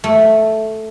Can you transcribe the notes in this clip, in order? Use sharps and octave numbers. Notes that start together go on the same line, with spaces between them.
A3